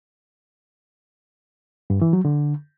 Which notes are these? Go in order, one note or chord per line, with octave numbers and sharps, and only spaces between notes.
G2
E3
F#3
D3